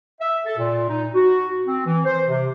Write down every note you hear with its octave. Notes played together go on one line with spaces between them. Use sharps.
E5
A4
A#2
D#4
F#4
C4
E3
C5
C3